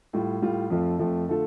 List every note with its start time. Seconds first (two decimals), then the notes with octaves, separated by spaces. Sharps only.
0.13 A2 G3 F4
0.42 A2 G3 F4
0.70 F2 F3 A3 F4
0.99 F2 F3 A3 F4
1.28 D3 A3 F4 A4